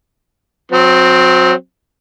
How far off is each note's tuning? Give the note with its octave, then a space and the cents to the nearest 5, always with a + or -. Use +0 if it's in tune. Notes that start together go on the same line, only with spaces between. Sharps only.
F#3 -30 C4 +0